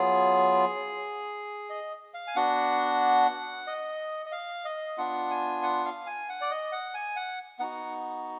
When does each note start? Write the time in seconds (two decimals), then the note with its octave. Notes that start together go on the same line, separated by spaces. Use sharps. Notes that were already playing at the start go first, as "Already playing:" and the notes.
Already playing: F#3 B3 F4 G#4
1.70 D#5
2.14 F5
2.28 G#5
2.36 B3 D4 F#4 F#5
3.67 D#5
4.26 D#5
4.32 F5
4.65 D#5
4.98 B3 D4 F4 F#5
5.31 G#5
5.63 F#5
5.85 F5
6.06 G#5
6.29 F#5
6.41 D5
6.50 D#5
6.72 F#5
6.94 G#5
7.16 F#5
7.59 B3 D#4 F#4 F#5